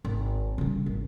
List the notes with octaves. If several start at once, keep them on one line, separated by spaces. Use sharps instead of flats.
G#1
C#3 G3
G#1